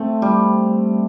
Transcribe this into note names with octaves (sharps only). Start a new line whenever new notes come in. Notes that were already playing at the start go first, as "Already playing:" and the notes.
Already playing: A3 C4
G3